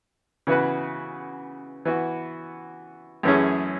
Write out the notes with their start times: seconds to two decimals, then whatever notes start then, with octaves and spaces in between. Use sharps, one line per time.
0.47 C#3 E3 B3 F#4 B4
1.85 E3 B3 F#4
3.23 F#2 E3 A3 C#4 G#4